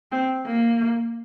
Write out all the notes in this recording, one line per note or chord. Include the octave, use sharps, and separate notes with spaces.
C4
A#3